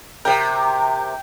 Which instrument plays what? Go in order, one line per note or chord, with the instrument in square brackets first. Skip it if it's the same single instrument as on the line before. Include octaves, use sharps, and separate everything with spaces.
[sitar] C3 A#4 [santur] G5